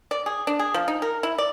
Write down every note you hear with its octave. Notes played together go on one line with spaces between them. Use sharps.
D5
G#4
D4
G#4
F3
D#4
A#4
E4
D5